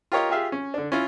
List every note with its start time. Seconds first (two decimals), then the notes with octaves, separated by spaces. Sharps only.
0.12 F4 G4 A#4 C#5 D#5 F5
0.30 F4 G4 G#4 E5 F5
0.52 C#4
0.74 D3 D4
0.92 C#4 E4 F4